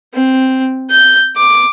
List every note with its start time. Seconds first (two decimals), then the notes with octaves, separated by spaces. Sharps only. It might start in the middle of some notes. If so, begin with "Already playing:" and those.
0.14 C4
0.90 G6
1.36 D6